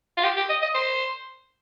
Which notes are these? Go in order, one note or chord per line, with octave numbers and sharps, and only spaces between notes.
F4
G4
G4
D#5
D#5
C5